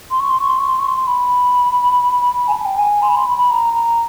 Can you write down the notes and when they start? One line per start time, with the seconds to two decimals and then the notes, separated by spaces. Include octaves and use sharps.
0.10 C6
0.19 C#6
0.29 C6
0.39 C#6
0.48 C6
0.58 C#6
0.68 C6
0.79 C#6
0.87 C6
1.07 B5
2.47 G#5
2.52 A5
2.65 G5
2.77 G#5
3.02 C6
3.08 B5
3.15 C6
3.25 B5
3.37 B5
3.50 A#5
3.73 A#5